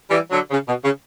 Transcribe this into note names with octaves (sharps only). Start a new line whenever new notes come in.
E3 G3
D3 F#3
C#3
B2
C#3